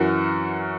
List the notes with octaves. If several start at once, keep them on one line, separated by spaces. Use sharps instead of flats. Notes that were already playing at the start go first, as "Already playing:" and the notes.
Already playing: F#2 E3 F#4 A#4